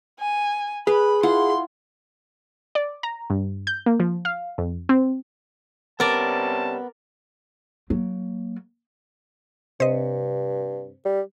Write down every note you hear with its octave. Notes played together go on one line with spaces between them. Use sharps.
G#5
G#4 B4 B5
E4 F4 F#5 C6
D5
A#5
G2
G6
A#3
F3
F5
F2
C4
C3 G3 B3 C#4 A#4 D5 A5
F#3 A#3
G2 C3 C5 D#5
G3